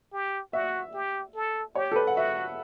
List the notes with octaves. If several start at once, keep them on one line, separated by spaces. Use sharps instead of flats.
G4
F#4 E5
G4
A4
G4 C#5
A4
B4
F#5
F#4 E5